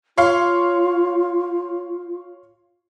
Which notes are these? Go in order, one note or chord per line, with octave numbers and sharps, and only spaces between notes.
F4 C#5 F5 C6